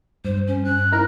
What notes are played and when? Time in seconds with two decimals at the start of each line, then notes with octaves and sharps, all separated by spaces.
0.25 G2 C5
0.47 C#4
0.65 F#6
0.92 D#4 E4 A#4 A#5